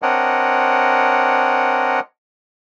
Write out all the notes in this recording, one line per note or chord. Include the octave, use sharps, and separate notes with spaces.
C4 D4 A#4 C#5 D#5 F#5